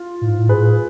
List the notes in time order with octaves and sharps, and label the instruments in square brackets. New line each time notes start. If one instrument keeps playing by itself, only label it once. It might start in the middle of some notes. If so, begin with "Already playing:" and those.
Already playing: [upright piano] F4
[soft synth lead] A2
G#2
A2
[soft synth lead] G#2 [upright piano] G#4 B4
[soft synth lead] A2